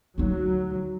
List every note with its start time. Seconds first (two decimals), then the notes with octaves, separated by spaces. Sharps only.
0.18 D2 F#3 D#4